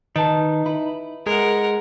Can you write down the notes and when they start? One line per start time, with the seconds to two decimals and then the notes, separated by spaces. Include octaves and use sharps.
0.16 D#3 D#4 B4 A5
0.66 E4 B4
1.27 G#3 A#4 F#5